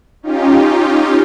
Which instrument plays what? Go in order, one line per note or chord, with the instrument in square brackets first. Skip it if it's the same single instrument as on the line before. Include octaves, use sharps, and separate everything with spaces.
[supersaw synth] C#4 D#4 F4 G4